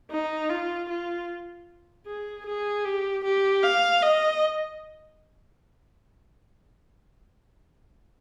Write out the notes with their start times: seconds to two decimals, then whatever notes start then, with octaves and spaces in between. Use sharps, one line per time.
0.11 D#4
0.50 F4
0.89 F4
2.07 G#4
2.46 G#4
2.85 G4
3.24 G4
3.63 F5
4.02 D#5